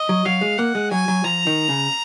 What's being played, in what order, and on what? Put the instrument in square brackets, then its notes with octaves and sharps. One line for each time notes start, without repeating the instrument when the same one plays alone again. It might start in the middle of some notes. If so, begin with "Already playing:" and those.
Already playing: [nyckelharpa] D#5
[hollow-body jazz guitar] F#3
[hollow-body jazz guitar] F#3 [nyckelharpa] F5
[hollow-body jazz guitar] G#3
[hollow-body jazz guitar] A#3 [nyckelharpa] F#5
[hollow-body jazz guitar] G#3
[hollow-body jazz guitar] F#3 [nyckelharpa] G#5
[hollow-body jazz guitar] F#3
[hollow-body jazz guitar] F3 [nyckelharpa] A#5
[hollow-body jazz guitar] D#3
C#3